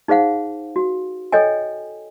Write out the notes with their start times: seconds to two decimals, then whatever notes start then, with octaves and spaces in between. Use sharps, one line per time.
0.08 D#4 G#4 C5 F5 F#5
0.76 F#4
1.32 A4 C#5 D#5 G5 G#5